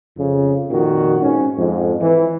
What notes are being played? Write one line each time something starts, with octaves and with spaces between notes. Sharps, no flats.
F2 C#3
F2 A#2 D#3 F#4
G#2 C#4
F2 G#2
E3